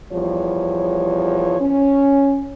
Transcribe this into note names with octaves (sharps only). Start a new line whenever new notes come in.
E2 F3 G3 C#5
C#4